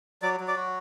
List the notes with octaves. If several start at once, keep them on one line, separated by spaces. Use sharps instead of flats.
F#3 D5 D6
F#3
D5 D6
F#4